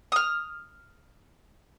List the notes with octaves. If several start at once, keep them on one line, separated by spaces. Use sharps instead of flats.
D#6 F6